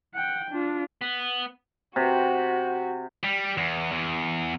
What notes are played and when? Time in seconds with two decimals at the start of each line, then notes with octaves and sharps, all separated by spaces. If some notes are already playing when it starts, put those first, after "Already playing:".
0.14 F#5 G5
0.51 D4 F4
1.01 B3
1.96 C3 F#4
3.23 G3
3.58 E2
3.92 E2